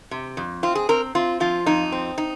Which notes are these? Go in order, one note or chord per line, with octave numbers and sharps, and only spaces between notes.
C3
F2
C4 F4
G#4
C4 A#4
C4 F4
F3 F4
F2 D#4
C4
D#4